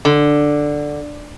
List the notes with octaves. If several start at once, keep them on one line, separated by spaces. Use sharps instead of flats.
D3